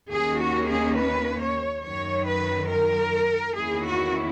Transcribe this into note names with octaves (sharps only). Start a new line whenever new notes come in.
D#2 D#3 A#3 C#4 G#4
F#4
G#4
B4
C#5
F#2 D#3 F#3 C#5
B4
A#4
E2 D#3 A#3 C#4 E4 G#4
F#4